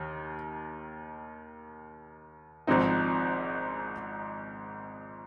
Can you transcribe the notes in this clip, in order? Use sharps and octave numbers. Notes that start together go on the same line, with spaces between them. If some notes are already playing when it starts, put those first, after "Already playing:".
Already playing: D#2 D#3
G#1 G#2 F3 C4 D#4